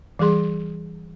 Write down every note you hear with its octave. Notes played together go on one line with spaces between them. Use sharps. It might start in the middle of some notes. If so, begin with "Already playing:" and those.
E3 G3 G#4 C6